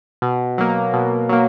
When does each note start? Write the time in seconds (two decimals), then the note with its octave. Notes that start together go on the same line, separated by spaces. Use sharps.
0.22 B2
0.58 F#3 A#3
0.94 B2
1.29 F#3 A#3